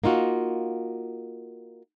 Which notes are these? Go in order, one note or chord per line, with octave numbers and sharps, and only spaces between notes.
A#3 D#4 F4 F#4